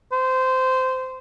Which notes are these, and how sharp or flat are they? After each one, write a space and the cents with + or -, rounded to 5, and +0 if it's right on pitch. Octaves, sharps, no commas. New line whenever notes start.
C5 -15